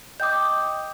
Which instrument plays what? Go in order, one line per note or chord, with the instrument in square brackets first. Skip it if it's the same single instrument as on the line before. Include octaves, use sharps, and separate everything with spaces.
[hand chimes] D#5 G5 D#6 [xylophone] D6 G6